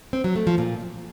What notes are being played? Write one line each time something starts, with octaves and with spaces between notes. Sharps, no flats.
C4
F#3
A3
F3
A#2